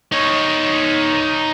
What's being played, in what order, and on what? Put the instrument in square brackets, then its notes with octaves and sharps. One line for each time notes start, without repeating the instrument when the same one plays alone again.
[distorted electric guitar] D#4 C#5